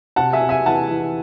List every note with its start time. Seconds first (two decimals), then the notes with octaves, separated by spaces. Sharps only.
0.16 C3 F#5 A5
0.33 E5 G#5
0.41 C3
0.49 E5 G#5
0.66 E3 F#5 A5
0.91 E3